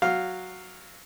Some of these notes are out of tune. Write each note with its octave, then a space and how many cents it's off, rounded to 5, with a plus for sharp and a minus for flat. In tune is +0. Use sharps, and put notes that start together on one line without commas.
F#3 +0 F5 +0